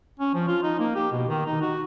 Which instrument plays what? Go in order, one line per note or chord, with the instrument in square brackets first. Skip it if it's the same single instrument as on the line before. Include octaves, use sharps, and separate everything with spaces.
[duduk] C#4
F3
F4
D#4
A#3
G4
B2
D#3
D#4
F#4